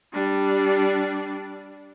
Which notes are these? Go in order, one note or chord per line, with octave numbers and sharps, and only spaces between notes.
G3 D4